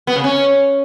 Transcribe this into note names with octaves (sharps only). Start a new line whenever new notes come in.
B3
C#3
C#4